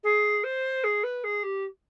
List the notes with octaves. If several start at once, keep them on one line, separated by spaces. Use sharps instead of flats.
G#4
C5
G#4
B4
G#4
G4